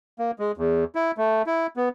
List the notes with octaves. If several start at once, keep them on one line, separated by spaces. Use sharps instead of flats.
A#3
G#3
E2
E4
A3
E4
B3